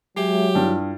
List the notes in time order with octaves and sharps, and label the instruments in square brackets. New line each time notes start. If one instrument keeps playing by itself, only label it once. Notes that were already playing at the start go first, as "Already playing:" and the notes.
[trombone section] F#3 [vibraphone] G#3 G#4 E5 [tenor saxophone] G4
[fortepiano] G2 [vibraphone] E4 F4